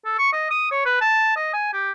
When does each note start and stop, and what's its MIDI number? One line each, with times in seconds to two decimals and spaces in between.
0.05 0.14 69
0.18 0.31 85
0.33 0.48 75
0.51 0.70 87
0.71 0.84 73
0.85 1.00 71
1.01 1.31 81
1.36 1.50 75
1.53 1.72 80
1.73 1.91 67